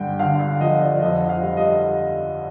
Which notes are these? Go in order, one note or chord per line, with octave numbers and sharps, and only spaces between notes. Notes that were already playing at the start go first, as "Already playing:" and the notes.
Already playing: G2 D3 G5
D3 F5
F5
F3 D#5
D5
F2 D#5
F5
G3
D#5